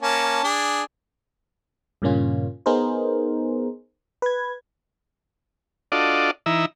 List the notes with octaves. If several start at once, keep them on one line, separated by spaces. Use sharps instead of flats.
A#3 C#4 A5
D4 G#4
G2 A#2 C#3 A#3 C#4 F4
B3 D#4 G#4 A#4 C5
B4 G#6
D4 F4 F#4 A4 D5 D#5
E3 D#4 E4 A#5 E6